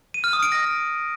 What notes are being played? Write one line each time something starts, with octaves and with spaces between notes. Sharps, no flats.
D#7
F6
D#6
D7
A#6